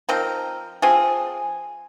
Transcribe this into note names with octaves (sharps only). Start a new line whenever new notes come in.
F3 C4 D#4 A#4
F3 C4 F4 G#4